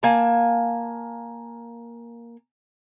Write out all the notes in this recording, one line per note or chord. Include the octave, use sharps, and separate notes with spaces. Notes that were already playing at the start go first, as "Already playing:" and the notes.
A#3 G#5 A5